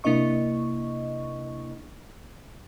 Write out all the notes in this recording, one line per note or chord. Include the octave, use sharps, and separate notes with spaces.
C3 A#3 D4 E4 D#5 C#6